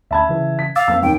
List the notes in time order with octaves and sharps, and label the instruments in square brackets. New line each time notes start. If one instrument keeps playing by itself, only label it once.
[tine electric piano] D2 B5 [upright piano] E5 A5 G#6
[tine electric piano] C#3 E3
[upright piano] B6
[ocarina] F5 [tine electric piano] D6 E6 A6
[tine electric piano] F2 A#3 C4 [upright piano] E6
[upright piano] D#2 [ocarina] G5